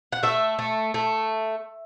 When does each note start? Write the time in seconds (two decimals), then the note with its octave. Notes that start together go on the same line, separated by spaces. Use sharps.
0.12 F#5
0.23 A3 E5
0.59 A3
0.94 A3